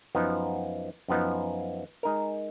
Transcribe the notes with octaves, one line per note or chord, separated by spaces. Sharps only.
F#2 F3 B3 D#4
F#2 F3 B3 D#4
G#3 D#4 A#4